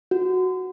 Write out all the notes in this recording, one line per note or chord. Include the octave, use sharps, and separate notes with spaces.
F#4